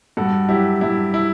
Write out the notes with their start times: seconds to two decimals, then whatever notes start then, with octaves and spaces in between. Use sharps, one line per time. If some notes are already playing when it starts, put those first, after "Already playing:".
0.17 G2 F#4 A4
0.49 F#3 E4 G4
0.81 G2 E4
1.14 E4